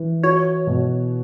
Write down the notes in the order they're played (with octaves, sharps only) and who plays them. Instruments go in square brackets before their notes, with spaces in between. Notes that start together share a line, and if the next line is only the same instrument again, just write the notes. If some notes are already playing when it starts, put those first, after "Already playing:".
Already playing: [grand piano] E3
[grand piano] F#4 [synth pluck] C#5
[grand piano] B2